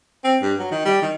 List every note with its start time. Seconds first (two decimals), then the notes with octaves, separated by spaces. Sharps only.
0.25 C4
0.42 G2
0.60 F#3
0.72 D#3
0.85 G3
1.02 D#3